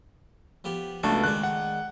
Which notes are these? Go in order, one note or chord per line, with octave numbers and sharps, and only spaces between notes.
F3 B3 G4
C#2 A3 B3 D4 F#4 A5
D#3 G#3 D5 F#6
F#5